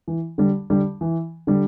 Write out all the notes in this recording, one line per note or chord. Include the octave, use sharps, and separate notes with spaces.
E3
D3 G3
D3 G3
E3
D3 G3